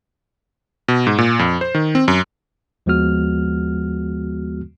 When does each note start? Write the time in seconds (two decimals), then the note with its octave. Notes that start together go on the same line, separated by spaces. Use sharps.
0.88 B2
1.07 G#2
1.18 A#2
1.39 F2
1.61 C5
1.75 D#3
1.95 C4
2.08 F#2
2.86 D#2 F3 G#3 B3 F#4 F6